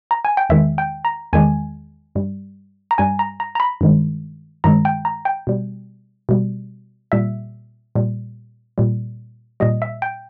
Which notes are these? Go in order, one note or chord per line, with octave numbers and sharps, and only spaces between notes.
A#5
G#5
G5
E2 D#3 G#3 E5
G5
A#5
E2 D#3 G#3 G#5
G2 G3
A#5
G2 G3 G#5
A#5
A#5
A#5
B5
G2 D#3 G#3
G2 D#3 G#3 A#5
G5
A#5
G5
B2 G3
B2 G3
A#2 G3 E5
A#2 G3
A#2 G3
A#2 G3 D#5
E5
G5